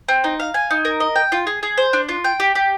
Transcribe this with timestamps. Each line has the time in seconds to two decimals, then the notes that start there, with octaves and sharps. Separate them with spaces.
0.08 C4
0.24 D#4
0.40 F5
0.54 G#5
0.70 D#4
0.85 A#4
1.00 D#5
1.16 G5
1.32 F4
1.47 G#4
1.63 G#4
1.77 C5
1.93 D4
2.09 F4
2.24 G5
2.40 G4
2.55 G4